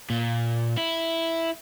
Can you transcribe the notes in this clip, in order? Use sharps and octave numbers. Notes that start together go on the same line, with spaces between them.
A#2
E4